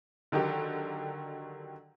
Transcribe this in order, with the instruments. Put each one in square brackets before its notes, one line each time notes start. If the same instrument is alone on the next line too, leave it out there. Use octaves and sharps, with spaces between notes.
[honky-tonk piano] D3 D#3 F#3 G4